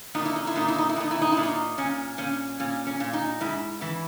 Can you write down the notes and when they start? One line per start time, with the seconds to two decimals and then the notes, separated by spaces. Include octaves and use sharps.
0.15 A#2 D#4
0.26 E4
0.36 D#4
0.47 E4
0.56 A#2 D#4
0.68 E4
0.78 D#4
0.89 E4
0.96 A#2 D#4
1.11 E4
1.22 D#4
1.32 A#2 E4
1.43 D#4
1.78 A#2 C#4
2.18 A#2 C#4
2.60 A#2 C#4
2.87 C#4
3.00 A#2
3.13 D#4
3.41 G#2 E4
3.81 E3 E4